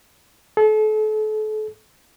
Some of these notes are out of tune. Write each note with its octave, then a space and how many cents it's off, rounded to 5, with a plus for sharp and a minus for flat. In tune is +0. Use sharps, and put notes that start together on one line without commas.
A4 -35